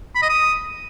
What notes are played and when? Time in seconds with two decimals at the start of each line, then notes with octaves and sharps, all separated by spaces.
0.15 B5
0.22 D#5
0.29 D#6